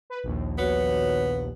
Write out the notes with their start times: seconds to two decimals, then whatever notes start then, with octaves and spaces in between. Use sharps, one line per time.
0.10 B4
0.24 A#1 D#2
0.58 B3 F#4 C#5